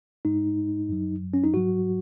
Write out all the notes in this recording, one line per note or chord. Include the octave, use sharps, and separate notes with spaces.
G#2 G#3 D#4
F#2 F#3
C#4
D#4
G#2 F#3 F#4